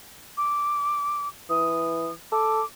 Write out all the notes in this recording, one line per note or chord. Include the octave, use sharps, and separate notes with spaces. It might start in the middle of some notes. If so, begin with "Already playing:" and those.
D6
E3 D#6
A4 D6